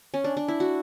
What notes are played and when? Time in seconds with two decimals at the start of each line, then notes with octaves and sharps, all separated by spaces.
0.14 C#4
0.24 D4
0.37 D4
0.48 E4
0.60 F#4